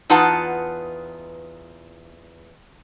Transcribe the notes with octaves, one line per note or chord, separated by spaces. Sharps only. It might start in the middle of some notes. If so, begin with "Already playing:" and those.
E2 D#4 F4 B4 F#5 A5